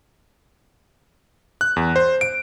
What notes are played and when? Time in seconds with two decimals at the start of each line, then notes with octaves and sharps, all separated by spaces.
1.61 F#6
1.76 E2
1.96 C5
2.21 D7